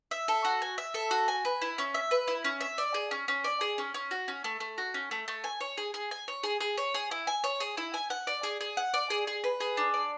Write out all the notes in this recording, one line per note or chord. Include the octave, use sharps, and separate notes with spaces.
E5
A4
F#4
G#5
E5
A4
F#4
G#5
B4
E4
C#4
E5
B4
E4
C#4
E5
D5
G#4
C#4
C#4
D5
G#4
C#4
C#4
F#4
C#4
A3
A3
F#4
C#4
A3
A3
G#5
C#5
G#4
G#4
G#5
C#5
G#4
G#4
C#5
G#4
E4
G#5
C#5
G#4
E4
G#5
F#5
D5
G#4
G#4
F#5
D5
G#4
G#4
B4
G#4
D4
D5